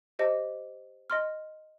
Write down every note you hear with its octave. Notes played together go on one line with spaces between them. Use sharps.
G4 C5 D#5
D#5 C6 F6